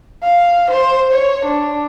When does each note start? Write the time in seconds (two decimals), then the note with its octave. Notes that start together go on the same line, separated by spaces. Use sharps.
0.23 F5
0.70 C5
1.12 C#5
1.45 D4